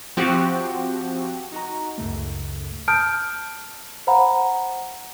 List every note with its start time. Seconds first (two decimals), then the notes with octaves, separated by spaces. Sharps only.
0.17 F3 C4 F#4 G4
1.52 D#4 F#4 D#5 A#5
1.98 C#2 F#2 C#3 A3
2.88 A5 D#6 F6 G6 D7
4.07 C5 F5 F#5 A#5 B5